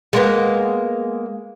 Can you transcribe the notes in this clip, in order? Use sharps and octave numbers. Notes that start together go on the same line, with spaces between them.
G#3 A#3 B3